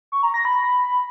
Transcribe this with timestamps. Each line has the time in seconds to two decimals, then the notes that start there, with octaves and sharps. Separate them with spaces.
0.12 C#6
0.23 A#5
0.34 A#6
0.45 B5